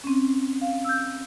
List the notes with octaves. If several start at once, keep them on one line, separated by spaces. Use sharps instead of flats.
C4 C#4
F5
E6 G6